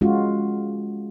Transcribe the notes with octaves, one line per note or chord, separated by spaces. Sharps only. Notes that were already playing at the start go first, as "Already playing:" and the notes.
G#3 C#4 F4 F#4